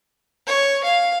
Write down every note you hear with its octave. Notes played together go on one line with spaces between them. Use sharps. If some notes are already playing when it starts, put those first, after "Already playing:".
C#5
F5